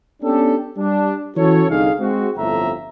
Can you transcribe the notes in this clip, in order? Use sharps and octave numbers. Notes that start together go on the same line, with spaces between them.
B3 C#4 D4 G4 A4
G3 D4
E3 C#4 F#4 A4 C#5
C2 D3 D#4 G#4 F5
G#3 C4 F#4
G1 F2 A2 A3 E5 A#5